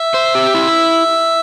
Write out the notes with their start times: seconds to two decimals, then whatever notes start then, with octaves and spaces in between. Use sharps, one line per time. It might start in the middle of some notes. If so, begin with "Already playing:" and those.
Already playing: E5
0.14 C5
0.35 G4
0.55 E4